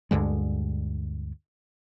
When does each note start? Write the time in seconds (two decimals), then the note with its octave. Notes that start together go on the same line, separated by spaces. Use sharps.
0.11 D2 G2 D3 G#3